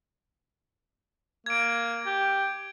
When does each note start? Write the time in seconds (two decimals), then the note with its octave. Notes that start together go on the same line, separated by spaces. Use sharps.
1.46 A#3 G#6 D7
2.06 G4